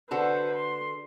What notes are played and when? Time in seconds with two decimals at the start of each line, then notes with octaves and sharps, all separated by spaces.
0.11 D3 F#4 A4 B4 C5
0.55 C6